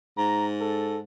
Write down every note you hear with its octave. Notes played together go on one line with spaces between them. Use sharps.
G#2 A#5
A4